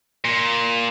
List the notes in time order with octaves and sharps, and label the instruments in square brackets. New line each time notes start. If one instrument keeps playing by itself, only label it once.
[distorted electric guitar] A#2